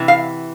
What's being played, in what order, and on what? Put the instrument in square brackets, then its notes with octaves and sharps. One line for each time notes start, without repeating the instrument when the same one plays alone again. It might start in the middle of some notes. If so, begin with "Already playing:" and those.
Already playing: [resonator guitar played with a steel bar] C3 E3
F5